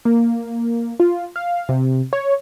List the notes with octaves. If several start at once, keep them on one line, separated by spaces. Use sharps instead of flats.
A#3
F4
F5
C3
C#5